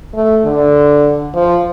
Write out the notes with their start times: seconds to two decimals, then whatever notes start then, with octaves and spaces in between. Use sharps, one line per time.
0.15 A3
0.45 D3
1.35 F3